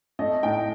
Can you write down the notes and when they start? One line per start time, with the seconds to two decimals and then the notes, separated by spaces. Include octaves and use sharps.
0.19 A3 D#5
0.43 A2 D#5 G5